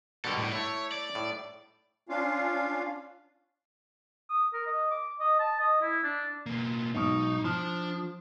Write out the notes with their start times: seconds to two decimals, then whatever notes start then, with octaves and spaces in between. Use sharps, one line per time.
0.25 B2 D3 G3 A4 A#4
0.38 A2
0.52 A3 E4 C#5
0.92 D5
1.15 A2
2.09 C#4 D4 F4 F5
4.30 D#6
4.53 A#4
4.67 D#5
4.91 D6
5.20 D#5
5.40 A5
5.60 D#5
5.82 E4
6.04 D4
6.46 B2 A#3
6.94 B1 G#2 B2 D#4
7.44 F3 D4 A5